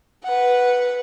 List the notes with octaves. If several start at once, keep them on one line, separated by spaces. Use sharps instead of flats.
B4 F#5